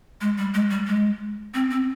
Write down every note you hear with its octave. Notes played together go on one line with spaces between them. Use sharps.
G#3
G3
G#3
G3
G#3
C4
C4